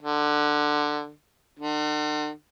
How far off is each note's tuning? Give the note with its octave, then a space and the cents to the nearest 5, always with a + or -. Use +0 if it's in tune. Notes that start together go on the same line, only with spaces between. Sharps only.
D3 +15
D3 +45